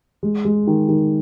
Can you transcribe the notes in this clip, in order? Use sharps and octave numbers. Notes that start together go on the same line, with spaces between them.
G#3
G#3
D#3
D#3